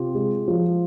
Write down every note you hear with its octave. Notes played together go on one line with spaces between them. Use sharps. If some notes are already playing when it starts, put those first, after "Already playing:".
Already playing: C3 F4 G4
G#3
F3